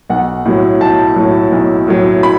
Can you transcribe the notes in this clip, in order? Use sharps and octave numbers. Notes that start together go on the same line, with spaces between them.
B1 F#5
A2 F#3
B1 A5
A2 F#3
B1
A2 F#3
B5